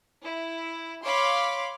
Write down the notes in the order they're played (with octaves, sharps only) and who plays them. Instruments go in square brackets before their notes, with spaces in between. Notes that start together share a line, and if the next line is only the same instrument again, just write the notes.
[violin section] E4
C#5 F5 B5 C6 D6